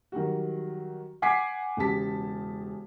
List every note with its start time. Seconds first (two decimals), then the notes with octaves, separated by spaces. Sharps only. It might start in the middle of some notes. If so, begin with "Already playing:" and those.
0.12 D#3 F#3 G3 F#4
1.22 F#5 G#5 D6 G#6 B6 C7
1.77 E1 C#3 G4 A5 B6